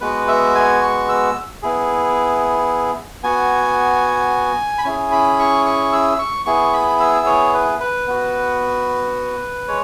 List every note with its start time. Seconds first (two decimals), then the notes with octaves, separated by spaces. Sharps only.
0.01 G#3 B3 F#4 B4
0.28 E5
0.55 G#5
0.82 C#6
1.09 E6
1.63 B3 E4 G#4
3.23 B3 F#4 G#5
4.78 B5
4.84 C#4 E4 G#4 G#5
5.12 B5
5.39 C#6
5.66 C#6
5.93 E6
6.19 C#6
6.46 B3 E4 G#4 C#6
6.73 B5
7.00 E6
7.26 C#5
7.54 B4
7.80 B4
8.07 B3 F#4
9.68 G#3 C#5